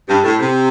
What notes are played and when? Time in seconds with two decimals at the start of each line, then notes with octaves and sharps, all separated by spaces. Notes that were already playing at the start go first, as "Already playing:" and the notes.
0.09 G2
0.23 A2
0.39 C3